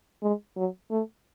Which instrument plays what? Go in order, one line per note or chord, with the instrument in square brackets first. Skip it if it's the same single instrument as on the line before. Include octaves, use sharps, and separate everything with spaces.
[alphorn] G#3
F#3
A3